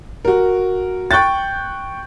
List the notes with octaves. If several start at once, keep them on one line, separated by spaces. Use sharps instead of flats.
F#4 A#4
G5 C#6 F#6 G6 A6